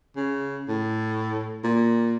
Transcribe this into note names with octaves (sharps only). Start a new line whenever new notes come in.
C#3
A2
A#2